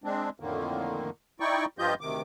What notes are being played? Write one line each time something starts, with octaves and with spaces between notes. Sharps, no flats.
G#3 C4 D4
F2 A2 D3 D#3 A#3
D#4 E4 D5 G5 C#6
G2 F3 F4 G4 D#5 G6
D2 C3 D#3 D6